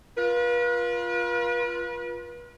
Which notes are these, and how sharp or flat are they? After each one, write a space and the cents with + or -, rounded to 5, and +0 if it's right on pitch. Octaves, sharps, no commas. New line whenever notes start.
F4 +0 B4 -40